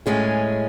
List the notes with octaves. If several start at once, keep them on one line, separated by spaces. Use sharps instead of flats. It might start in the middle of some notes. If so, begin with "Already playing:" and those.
A2 G#3 C#4 G#4